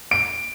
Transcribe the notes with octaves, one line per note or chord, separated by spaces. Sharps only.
D7